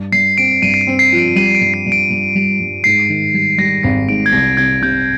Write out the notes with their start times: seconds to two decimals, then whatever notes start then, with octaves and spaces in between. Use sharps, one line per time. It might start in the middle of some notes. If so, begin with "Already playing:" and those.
Already playing: G2
0.12 G2 C7
0.38 C4 D7
0.62 G2 D#7
0.74 C7
0.81 D7
0.87 C4
0.99 C7
1.12 F3
1.18 D7
1.36 G3 D#7
1.55 D7
1.61 G2
1.74 C7
1.86 G2
1.92 D7
2.10 G2
2.35 G3
2.60 G2
2.84 G#2 C7
3.09 D#3
3.34 G3
3.58 G3 A#6
3.83 G#1 C7
4.08 G#2 D7
4.26 G#6
4.32 C2 A#6
4.57 C2 G#6
4.82 C3 G6